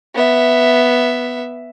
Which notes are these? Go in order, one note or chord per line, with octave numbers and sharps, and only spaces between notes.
B3 E5